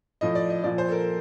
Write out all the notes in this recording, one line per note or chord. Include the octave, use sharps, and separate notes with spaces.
A2 F3 D#5
D5
D#5
A#2 F3 D5
C5
A4
A#4